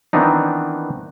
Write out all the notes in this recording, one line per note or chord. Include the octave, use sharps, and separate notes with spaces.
D#3 E3 B3 C4 D4 D#4